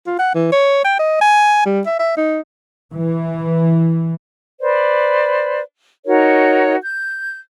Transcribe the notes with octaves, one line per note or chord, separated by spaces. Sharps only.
F4
F#5
E3
C#5
G5
D#5
G#5
G3
E5
E5
D#4
E3
B4 C5 D5
D#4 F#4 A#4 C#5
G6